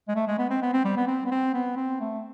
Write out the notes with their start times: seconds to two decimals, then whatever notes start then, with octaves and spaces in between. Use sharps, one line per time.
0.08 G#3
0.16 A3
0.27 G#3
0.39 B3
0.50 C4
0.62 B3
0.73 C4
0.85 G3
0.97 B3
1.08 C4
1.26 B3
1.31 C4
1.54 B3
1.77 C4
2.00 A3